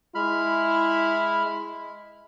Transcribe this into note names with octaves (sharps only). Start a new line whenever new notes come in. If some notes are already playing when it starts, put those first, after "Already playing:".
G#3 E4 B5 F6